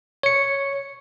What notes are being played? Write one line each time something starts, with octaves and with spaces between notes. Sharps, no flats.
C#5 C#7